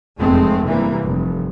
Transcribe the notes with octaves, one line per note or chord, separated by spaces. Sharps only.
F1 E2 G#2 G#3 A3 C4
G2 C3 E3 G3 A#3
F1